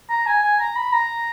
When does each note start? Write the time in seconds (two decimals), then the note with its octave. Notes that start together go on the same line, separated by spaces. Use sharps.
0.09 A#5
0.26 G#5
0.43 G#5
0.59 A#5
0.76 B5
0.92 A#5